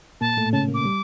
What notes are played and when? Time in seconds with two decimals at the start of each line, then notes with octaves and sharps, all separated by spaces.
0.21 A#2 A#3 A5
0.37 A2 A3
0.53 C#3 C#4 A5
0.68 A#2 A#3
0.74 D6
0.85 G3